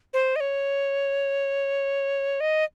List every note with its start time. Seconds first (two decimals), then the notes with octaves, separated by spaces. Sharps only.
0.13 C5
0.36 D#5
0.40 C#5
2.40 D#5